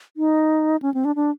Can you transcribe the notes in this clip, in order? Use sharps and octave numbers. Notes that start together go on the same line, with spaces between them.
D#4
C#4
C4
D4
D4